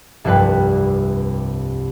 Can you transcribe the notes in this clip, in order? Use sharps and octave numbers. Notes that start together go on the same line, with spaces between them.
F1 C2 G2 B4 F#6